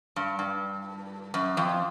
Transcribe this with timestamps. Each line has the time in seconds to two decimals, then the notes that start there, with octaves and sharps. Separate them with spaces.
0.16 G2
0.39 G2
1.34 F#2
1.57 F2